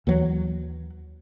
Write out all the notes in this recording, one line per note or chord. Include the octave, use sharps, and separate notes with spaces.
D#2 E3 F#3